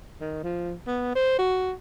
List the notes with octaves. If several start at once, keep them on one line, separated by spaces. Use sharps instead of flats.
D#3
F3
B3
C5
F#4